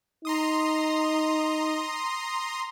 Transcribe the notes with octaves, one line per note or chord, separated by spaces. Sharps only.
D#4 A#5 C6 D#6